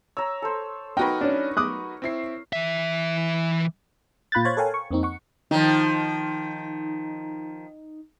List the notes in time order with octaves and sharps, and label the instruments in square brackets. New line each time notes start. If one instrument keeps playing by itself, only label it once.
[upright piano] C#5 [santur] A#5 E6
[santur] A4 C5
[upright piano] D#4 F#4 B4 [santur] A#4 C#5 [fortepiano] G5
[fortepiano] C#4 D4
D6 D#6 F#6
[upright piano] C4 E4 C7
[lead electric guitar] E3 E5
[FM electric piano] A#2 F4 B5 F#6 G6 A6
C5 C#5 F5 F#6 G#6 A6
A4 A#4 C#5 F5 G5 G#5
C#6
F2 A#3 C4 D#4
F#5 C#6
[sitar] D#3 F3 [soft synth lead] D#4